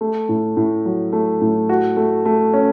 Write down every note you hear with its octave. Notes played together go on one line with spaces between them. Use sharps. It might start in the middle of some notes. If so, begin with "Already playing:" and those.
A3
A2
A2
F#3
A3
A2
F#4
A3
A3
C#4